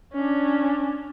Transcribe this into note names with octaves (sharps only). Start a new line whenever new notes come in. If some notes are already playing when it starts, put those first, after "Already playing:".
C#4 D4